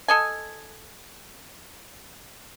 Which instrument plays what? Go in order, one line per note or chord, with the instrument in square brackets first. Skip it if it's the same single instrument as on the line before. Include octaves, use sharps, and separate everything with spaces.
[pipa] A4 D#5 G#5